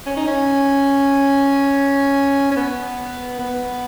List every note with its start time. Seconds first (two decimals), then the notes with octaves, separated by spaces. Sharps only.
0.06 C#4
0.17 D#4
0.27 C#4
2.51 C#4
2.56 B3
3.39 B3